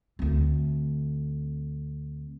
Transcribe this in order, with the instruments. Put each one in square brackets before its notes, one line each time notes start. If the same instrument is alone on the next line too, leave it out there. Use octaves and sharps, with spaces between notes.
[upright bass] D2 C4